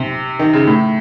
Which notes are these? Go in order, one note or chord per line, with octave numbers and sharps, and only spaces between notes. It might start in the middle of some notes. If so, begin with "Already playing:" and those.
Already playing: C3
D#3
C#3
A2